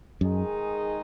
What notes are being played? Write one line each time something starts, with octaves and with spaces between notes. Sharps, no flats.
F#2 D#3 G#3 D#4 G#4